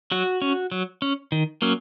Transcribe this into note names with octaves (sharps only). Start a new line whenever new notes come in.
F#3 F#4
C#4
F#3
C#4
D#3
F#3 A#3 C#4